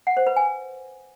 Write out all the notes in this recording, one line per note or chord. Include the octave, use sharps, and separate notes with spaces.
F#5
C5
B4
G#5